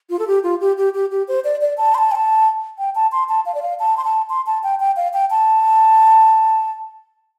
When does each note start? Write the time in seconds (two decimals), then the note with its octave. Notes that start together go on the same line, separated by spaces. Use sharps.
0.10 F4
0.19 A4
0.27 G4
0.43 F4
0.61 G4
0.78 G4
0.94 G4
1.11 G4
1.28 C5
1.44 D5
1.61 D5
1.78 A5
1.95 C6
1.98 A5
2.12 G5
2.15 A5
2.78 G5
2.95 A5
3.12 C6
3.29 A5
3.46 F5
3.54 D5
3.62 F5
3.79 A5
3.97 C6
4.04 A5
4.30 C6
4.46 A5
4.63 G5
4.80 G5
4.96 F5
5.14 G5
5.30 A5